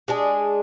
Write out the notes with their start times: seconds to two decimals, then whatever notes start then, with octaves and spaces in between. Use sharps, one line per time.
0.08 G#3 D4 G#4